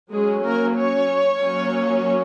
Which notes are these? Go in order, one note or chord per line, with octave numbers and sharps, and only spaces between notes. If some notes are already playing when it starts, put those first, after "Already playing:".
F#3 G#3 C#4 G#4
A#3 A#4
C#4 C#5
F#3 A#3 C#4